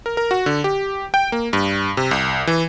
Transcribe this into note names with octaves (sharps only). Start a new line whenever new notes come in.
A#4
A#4
F#4
D3
G4
G5
A#3
G2
C3
C2
E3